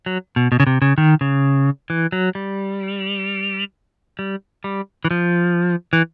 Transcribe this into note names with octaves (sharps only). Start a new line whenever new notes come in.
F#3
B2
B2
C#3
C3
C#3
D#3
C#3
E3
F#3
G3
G3
G3
E3
F3
E3